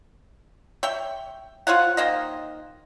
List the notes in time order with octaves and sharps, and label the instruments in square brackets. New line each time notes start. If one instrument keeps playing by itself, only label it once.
[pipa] C#5 E5 G5
F4 C5 C#5 F#5
D#3 A#3 C5 D#5